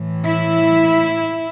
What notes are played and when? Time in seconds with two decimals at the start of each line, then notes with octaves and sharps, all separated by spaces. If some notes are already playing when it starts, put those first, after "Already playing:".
Already playing: A2 E3
0.26 E4